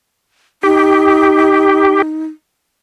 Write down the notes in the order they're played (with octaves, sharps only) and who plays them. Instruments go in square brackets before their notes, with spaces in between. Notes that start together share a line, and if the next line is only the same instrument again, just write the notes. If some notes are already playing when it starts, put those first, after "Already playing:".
[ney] D#4 [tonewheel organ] G4